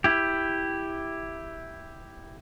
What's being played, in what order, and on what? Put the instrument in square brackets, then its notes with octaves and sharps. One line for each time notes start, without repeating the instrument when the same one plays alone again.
[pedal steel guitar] E4 G4